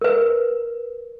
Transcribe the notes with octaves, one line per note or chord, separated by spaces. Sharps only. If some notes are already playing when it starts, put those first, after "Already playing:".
A#4 B4